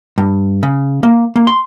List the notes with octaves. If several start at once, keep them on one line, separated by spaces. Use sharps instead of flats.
G2
C#3
A#3
A#3
C6